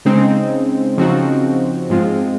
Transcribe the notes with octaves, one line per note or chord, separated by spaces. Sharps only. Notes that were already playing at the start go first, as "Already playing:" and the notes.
C#3 G#3 C4 D#4
C#3 F3 C4 D#4 F#4
G#2 F3 G#3 C4 F4